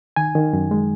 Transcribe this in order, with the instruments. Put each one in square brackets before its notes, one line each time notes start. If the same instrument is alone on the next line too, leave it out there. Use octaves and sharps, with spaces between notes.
[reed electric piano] D#3 G#5
D#3
F#2
G#3